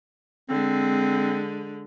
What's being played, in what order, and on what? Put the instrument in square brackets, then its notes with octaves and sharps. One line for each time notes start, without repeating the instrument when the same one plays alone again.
[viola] D3 G#3 [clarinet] C4